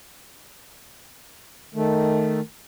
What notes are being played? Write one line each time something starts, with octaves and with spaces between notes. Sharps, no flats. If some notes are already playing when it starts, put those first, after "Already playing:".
D#3 A3